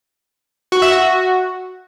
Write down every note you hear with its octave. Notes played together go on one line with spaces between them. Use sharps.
F#4
E5
F#4